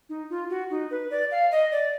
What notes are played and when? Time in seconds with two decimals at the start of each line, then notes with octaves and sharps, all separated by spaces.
0.09 D#4
0.30 F4
0.50 F#4
0.70 D#4
0.91 B4
1.11 D5
1.31 F5
1.51 D#5
1.72 D5